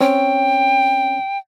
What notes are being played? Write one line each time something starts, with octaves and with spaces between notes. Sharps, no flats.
C4 C#4 C#5 G5